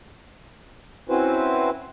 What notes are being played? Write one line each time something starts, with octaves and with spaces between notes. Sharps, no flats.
C4 C#4 E4 F#4 B4 C5